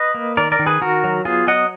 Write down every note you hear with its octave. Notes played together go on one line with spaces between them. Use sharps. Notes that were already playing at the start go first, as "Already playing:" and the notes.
Already playing: B4 D#5
A#3
D#3 A#4 D5
A#4 D5
D#3
G#4 B4
D#3 F#4 A#4
F#3
B3 F4 G#4
F#3 D#5 F#5